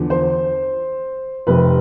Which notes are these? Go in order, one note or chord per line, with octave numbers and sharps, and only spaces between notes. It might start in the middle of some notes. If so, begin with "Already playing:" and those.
Already playing: E2 D3 F3
C5
F1 F2 C3 B4